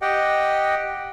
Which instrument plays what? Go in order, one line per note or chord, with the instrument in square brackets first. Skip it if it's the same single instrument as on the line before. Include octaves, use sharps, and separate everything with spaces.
[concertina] G4 D#5 F#5 G5